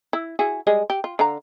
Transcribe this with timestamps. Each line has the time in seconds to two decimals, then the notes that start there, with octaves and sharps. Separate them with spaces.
0.13 E4
0.39 E4 F#4 G#4
0.67 G3 G#3 G#4
0.90 G4
1.04 F4
1.19 D3 F5 A#5